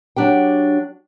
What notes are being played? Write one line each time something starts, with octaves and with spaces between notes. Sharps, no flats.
F#3 D4 G4 G5